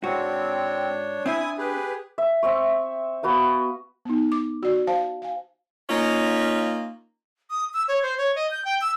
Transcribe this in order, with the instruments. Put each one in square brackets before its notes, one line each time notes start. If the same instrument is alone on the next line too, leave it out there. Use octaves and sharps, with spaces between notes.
[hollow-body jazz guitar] G#2 F#4 [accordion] C4 [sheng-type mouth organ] D4 C#5
[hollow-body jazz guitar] C4 D4 E5 [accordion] E4 [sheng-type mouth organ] G#5 D#6
[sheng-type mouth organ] G4 G#4 [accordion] B4
[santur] E5
C4 E5 C#6
B3 F#4 B4 F5
[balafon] B3 D#4
D6
F#4 D5
C5 F5 A5
F5 G#5
[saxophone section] A#3 C#4 D#4 F4
[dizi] D#6
E6
C#5
C5
C#5
D#5
G6
G5
E6